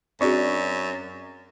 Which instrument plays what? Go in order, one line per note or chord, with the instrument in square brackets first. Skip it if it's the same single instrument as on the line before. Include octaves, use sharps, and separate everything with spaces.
[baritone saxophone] F#2 [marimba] C4 F#4 G#4 [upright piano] D4 C#6